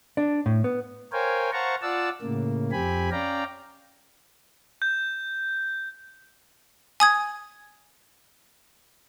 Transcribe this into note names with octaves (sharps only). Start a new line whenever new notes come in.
D4
A2
B3
A#4 C5 C#5 F5 G5 G#5
C5 F5 F#5 A5 A#5 C#6
F4 D5 F5 F#5 A5 E6
A2 C#3 A#3
F2 C4 G4 G#5 B5
C#4 D5 F5 G5 A#5
G6
G#5 D#6 G#6